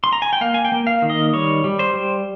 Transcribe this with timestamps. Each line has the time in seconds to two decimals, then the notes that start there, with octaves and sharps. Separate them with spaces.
0.04 C6
0.13 A#5
0.22 G#5
0.33 G5
0.41 A#3 F5
0.54 G#5
0.65 G5
0.72 A#3
0.87 F5
1.02 D#3
1.10 D#5
1.33 G3 C#5
1.64 G3
1.79 C5
1.94 G3